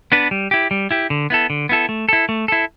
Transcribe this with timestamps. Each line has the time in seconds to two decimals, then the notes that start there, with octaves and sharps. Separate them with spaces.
0.12 B3 D4 B4
0.31 G3
0.51 E4 G4
0.71 G3
0.91 E4 G4
1.10 D3
1.30 B3 E4 A4
1.50 D3
1.69 B3 E4 A4
1.89 A3
2.09 E4 A4
2.29 A3
2.48 E4 A4